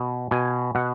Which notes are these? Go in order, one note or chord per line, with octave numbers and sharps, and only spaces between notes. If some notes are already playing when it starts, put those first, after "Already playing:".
Already playing: B2
B2 G#5
B2 F#5